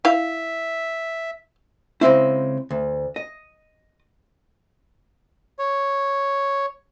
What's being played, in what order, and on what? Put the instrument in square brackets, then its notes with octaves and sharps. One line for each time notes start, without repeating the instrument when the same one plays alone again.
[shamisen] E4 F5 [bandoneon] E5
[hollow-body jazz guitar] C#3 G#3 C4 E4
D2
D#5
[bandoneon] C#5